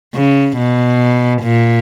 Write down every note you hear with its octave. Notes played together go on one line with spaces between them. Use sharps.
C#3
B2
A#2